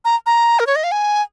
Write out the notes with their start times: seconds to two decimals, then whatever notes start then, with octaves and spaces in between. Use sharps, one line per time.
0.05 A#5
0.26 A#5
0.59 A#4
0.67 C#5
0.76 D#5
0.84 F5
0.92 G#5